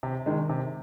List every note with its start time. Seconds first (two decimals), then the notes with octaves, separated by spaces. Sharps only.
0.03 C3
0.26 D#3 G#3
0.49 C3